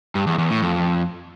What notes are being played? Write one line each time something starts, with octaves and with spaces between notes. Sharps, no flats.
G2
E2
E2
A2
F2